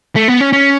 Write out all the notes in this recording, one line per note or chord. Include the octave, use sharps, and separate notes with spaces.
A3
B3
C#4
C#4